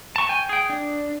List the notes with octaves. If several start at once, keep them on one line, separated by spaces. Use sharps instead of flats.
A5 C#6
G5 G#5
G#4 G5
D4